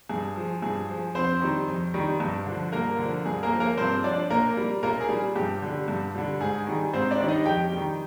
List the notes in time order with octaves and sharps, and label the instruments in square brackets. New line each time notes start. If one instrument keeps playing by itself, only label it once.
[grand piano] G2 G#4
F3
G2 G#4
F3
F2 C4 C5
D#3 G3
F2
D#3 G3
G2
D3 F3
G2 A#3 A#4
D3 F3
G2 G#4
A#3 A#4
F3
A#3 A#4
G2 C4 C5
F3 D4 D5
A#2 A#3 A#4
G3
A#2 A#3 A#4
G#4
G3
G2 G4
D3 G3
G2
D3 G3
G#2 G#4
D#3 G3
G#2 C4 C5
D4 D5
D#3 G3
D#4 D#5
F2 G4 G5
D#3 G3